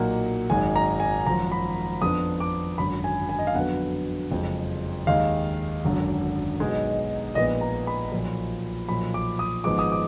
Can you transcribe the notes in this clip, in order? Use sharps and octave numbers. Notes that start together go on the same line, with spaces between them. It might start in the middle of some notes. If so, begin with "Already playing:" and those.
Already playing: B1 A#2 F#3 A#3 D#4 F#5
G#1 F#2 D#3 G#3 G#5
A#5
G#5
G#1 F#2 F3 A#5
B5
F2 F3 B3 D4 D#6
D6
G#1 F#2 D3 B5
G#5
G#5
D#5
F5
F2 D3 F#3 B3 F#5
F#1 F2 F3 G#3
D#2 D#3 G#3 D#4 F5
G#1 F#2 D3
B1 B2 G#3 D#4
A#1 A#2 G#3 B3 D#4 D#5
A#5
B5
B1 A#2 F3
B1 A#2 F3 B5
D6
D#6
G#1 G#2 F3 G#3 B3 D6
D#6
D6